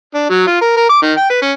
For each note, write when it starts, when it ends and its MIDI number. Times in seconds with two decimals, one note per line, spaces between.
0.15 0.26 62
0.30 0.43 54
0.47 0.61 65
0.61 0.73 70
0.77 0.86 70
0.89 0.99 86
1.02 1.12 51
1.17 1.26 79
1.30 1.37 71
1.42 1.51 61